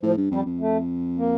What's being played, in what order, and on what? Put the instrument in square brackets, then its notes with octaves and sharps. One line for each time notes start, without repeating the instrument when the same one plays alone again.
[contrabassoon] A2 [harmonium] F3
[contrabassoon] G2
[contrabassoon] F2 [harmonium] G3
[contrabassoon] F2
[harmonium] A3
A#3